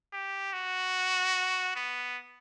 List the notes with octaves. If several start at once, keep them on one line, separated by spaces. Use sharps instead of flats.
G4
F#4
B3